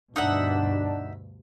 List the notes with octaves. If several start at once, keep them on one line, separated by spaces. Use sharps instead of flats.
D2 G2 B2 D4 D#4 E5 F#5